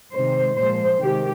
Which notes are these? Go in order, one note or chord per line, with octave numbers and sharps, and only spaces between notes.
C3 D#3 G#3 C5
A#2 F3 G#3 C5
C3 D#3 G#3 G4